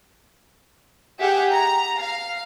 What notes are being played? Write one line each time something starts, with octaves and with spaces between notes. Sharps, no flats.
G4 G#4 E5 F#5 G5
A#5
F5